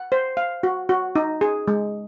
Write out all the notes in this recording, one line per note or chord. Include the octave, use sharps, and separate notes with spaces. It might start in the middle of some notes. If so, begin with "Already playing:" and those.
Already playing: F#5
C5
F5
F#4
F#4
D#4
G#4
G#3